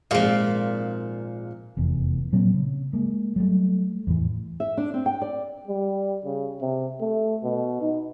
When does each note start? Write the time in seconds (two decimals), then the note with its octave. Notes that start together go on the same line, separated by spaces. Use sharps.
0.11 G#1 A#2 F3 G#3 F5
1.77 F1 E2
2.32 A#2 F#3 A#3 C4
2.54 C#3
2.93 G#3 A#3
3.36 F#3 G3 A3
4.07 E2 A2 E3
4.60 E5
4.77 D4
4.94 C4
5.06 G5
5.22 D5
5.68 G3
6.25 C#3
6.61 C3
7.01 A3
7.43 B2
7.81 D#4